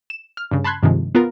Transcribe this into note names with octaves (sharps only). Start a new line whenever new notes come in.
E7
F6
G2 C#3
A5 B5 C6 F#6 G#6
G2 C3 D#3 F3 G#3
B3 F4 A#4